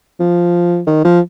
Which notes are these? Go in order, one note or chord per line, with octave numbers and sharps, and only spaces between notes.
F3
D#3
F3